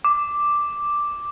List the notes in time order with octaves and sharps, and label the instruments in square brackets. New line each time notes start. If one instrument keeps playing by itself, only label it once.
[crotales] D6